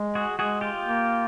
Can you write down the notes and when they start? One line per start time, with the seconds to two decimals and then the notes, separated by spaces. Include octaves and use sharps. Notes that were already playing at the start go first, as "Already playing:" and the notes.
Already playing: G#3
0.15 F#4 G#4
0.38 G#3 F#4 G#4
0.61 F4 G4
0.85 A#3